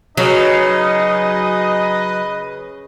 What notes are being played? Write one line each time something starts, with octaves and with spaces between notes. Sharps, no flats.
C#3 F#3 D#4 B4 D#5